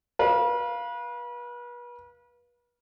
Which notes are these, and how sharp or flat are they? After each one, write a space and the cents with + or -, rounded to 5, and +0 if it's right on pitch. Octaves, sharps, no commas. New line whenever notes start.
B4 -35 F5 +0